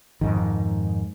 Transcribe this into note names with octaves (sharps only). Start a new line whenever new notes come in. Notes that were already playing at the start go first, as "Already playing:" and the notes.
F2 G#2 D#3